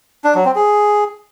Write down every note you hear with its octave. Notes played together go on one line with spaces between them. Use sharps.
D4
F#3
C4
G#4